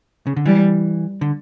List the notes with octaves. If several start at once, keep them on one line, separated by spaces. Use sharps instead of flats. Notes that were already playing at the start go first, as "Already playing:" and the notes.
C#3
D3
E3 G3
D3